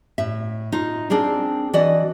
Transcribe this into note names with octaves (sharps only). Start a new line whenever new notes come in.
A2 E5
D#4 F4
C4 D4 G#4 A#4
E3 F#4 D5 D#5